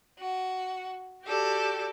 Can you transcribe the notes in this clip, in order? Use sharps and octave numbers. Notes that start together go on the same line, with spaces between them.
F#4
F#4 G4 A4 D5